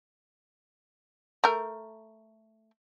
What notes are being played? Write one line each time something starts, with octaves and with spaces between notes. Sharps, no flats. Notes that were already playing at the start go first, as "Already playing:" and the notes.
A3 A#4